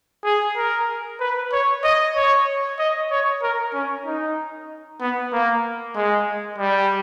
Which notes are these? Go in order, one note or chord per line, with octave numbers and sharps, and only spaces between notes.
G#4
A#4
B4
C#5
D#5
C#5
D#5
C#5
A#4
C#4
D#4
B3
A#3
G#3
G3